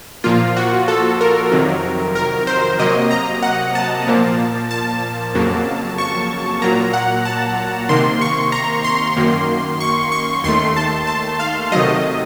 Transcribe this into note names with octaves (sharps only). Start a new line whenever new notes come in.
A#2 F3 A#3 F4
F#4
A4
A#4
F2 C3 D#3 F#3
A#4
C5
C3 F#3 A#3 D#5
A#5
F#5
A5
A#2 F3 A#3
A5
F2 C#3 F#3 A#3
C#6
A#2 F#3 A#3 A#5
F#5
A5
C3 D#3 A#3 C6
C#6
A#5
C6
F#2 D#3 A#3
C#6
C#6
D#2 D#3 A3 C6
A5
A5
F5
C3 D#3 F#3 A3 D#5